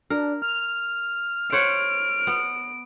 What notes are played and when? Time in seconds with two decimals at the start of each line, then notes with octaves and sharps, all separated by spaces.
0.10 D4 A#4
0.42 F6
1.52 C5 C#5 F#5 D7
2.27 B3